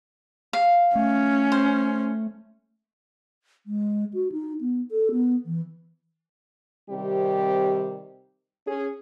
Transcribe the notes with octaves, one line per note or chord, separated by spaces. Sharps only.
F5
A3 C#4
C5
G#3
F#4
D#4
B3
A4
B3
E3
C3 D#3 G3 C4 G4
C#4 G#4